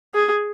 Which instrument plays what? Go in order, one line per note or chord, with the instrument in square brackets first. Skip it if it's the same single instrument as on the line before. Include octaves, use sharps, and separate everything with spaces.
[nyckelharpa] G#4